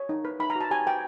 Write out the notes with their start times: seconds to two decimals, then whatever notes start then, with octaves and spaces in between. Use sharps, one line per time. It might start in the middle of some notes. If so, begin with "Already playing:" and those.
Already playing: C#5
0.09 D#4
0.25 B4
0.40 D#4 B5
0.50 A#5
0.56 F#4 A5
0.71 G4 G#5
0.86 B4 G5